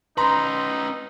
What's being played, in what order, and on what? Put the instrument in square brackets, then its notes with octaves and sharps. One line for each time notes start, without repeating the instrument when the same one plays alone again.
[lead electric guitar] C#4 B4 [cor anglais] D#4 [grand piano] A#5 [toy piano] C6